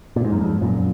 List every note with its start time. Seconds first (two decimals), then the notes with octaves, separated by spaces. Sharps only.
0.16 A#2
0.24 G#2
0.32 F#2
0.41 F2 G#2
0.61 F#2 A#2